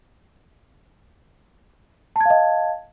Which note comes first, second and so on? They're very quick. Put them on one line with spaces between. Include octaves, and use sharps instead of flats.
A5 G#6 F5 D#5